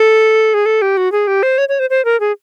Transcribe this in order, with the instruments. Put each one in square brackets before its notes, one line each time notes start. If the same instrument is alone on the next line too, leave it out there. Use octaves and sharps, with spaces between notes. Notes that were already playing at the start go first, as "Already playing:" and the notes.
Already playing: [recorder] A4
G#4
A4
G4
F#4
G#4
G4
C5
C#5
C#5
C5
C5
A#4
G#4